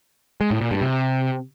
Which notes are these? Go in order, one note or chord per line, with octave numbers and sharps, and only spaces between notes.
G#3
A2
A#2
G2
C3